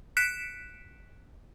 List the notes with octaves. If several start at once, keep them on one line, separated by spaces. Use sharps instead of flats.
F#6 B6 C#7 D7 E7